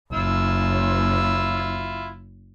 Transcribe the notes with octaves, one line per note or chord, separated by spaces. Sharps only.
F#1 E4 F4 E6